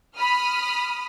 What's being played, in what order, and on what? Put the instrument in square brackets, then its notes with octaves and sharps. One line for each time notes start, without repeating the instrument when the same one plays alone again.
[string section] B5 D#6 F6